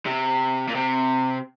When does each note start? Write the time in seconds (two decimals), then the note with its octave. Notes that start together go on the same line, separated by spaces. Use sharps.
0.06 C3
0.68 A#2
0.75 C3